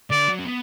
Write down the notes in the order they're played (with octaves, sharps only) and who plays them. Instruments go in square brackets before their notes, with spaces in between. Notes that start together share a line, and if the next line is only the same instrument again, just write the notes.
[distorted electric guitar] D3 [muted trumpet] D5
[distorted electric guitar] F#3
C#4
B3